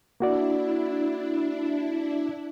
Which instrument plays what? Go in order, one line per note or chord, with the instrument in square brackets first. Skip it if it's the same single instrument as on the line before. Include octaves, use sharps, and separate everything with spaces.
[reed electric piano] A#3 F#4 D5 [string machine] D4 E4